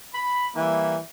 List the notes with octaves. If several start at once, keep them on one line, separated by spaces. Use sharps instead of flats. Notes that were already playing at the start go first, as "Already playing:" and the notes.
B5
E3 G3 A#3 E4